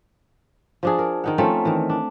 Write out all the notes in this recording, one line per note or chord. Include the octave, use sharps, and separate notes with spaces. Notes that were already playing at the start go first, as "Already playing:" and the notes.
F3 D4 G#4
A#4
D#3 D#4 F#5
F3 A3 C4 C#4
D#3 E3
D4